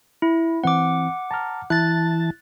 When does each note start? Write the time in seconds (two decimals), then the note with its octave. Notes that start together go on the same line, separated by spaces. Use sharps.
0.22 E4
0.64 E3 C4 F#5 D6
1.31 A5 A#5 F6
1.70 E3 E4 A5 F#6 A6